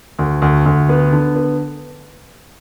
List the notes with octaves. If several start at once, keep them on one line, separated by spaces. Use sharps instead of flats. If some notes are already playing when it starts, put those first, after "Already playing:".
D2
D2
D2
B3
D3
B3